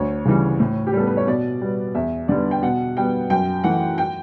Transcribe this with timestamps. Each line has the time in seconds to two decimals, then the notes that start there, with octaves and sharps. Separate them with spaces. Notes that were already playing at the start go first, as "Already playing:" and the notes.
Already playing: D2 C#5
0.25 C#3 E3 G3
0.60 A2
0.87 G4
0.93 G3 B3 A4
1.07 B4
1.17 C#5
1.27 B2 D5
1.61 G3 B3
1.95 E2 E5
2.28 D3 G3 B3 D5
2.51 G5
2.62 B2 F#5
2.97 G3 B3 G5
3.30 F#2 G5
3.64 E3 A3 F#5
3.98 G5